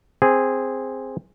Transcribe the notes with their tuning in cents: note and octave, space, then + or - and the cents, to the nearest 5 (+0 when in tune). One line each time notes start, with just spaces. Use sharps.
C4 +0 G#4 -10